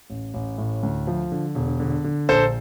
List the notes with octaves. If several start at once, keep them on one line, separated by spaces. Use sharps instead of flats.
A1
A1
A2
D2
F3
D3
E1
D3
D3
A#1 A4 C5